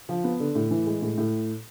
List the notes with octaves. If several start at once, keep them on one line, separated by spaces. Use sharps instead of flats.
F3
B3
D3
A2
E3
G#3
A2
A2